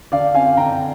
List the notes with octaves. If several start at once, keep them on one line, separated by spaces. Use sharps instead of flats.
D3 D5 F5
C4 F5 G#5
D3 G5 A#5